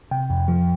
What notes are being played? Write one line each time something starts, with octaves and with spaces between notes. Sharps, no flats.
C3 G5
F2
F3